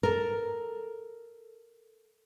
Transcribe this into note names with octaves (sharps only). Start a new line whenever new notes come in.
A4 A#4